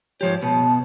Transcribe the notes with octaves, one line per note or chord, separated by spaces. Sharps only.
G#2 F3 G4 C#5
B2 B3 A5